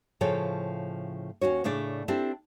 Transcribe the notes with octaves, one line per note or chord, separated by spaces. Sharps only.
A2 C#3 F3 A4 C#5 G5
D#2 C#4 F#4 C#5
A2 C#3 A3 D4 D5
C4 D4 E4 G4 A4